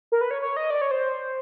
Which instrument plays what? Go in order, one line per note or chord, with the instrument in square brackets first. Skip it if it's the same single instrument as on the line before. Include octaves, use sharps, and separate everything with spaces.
[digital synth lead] A#4
B4
C#5
C#5
D#5
D5
C#5
C5